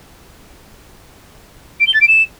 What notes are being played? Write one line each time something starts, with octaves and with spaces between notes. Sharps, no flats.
D7
G7
A6
D7
E7